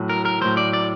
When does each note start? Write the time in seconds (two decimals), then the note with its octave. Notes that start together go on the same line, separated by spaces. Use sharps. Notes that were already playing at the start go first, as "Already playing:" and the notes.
Already playing: A2 F#3
0.10 A#4
0.25 A#4
0.41 A2 F#3 C5
0.57 D5
0.73 D5